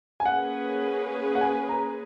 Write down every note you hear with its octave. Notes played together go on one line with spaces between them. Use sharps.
G#5
A#3 C#4 G#4 B4 F#5
F#5
G#5
A#5